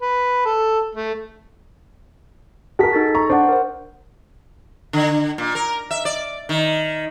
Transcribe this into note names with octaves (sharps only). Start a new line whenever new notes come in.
B4
A4
A3
F#4 G#4 A#4 A5 B6
D#4 A4 A6
A#5 C#6
D4 C5 F#5
A#4 C5
D3
A#2
A#4
E5
D5
D#3